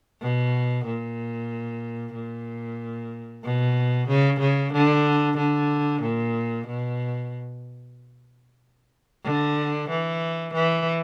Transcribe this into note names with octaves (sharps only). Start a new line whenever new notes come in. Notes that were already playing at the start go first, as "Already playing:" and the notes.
B2
A#2
A#2
B2
C#3
C#3
D3
D3
A#2
B2
D3
E3
E3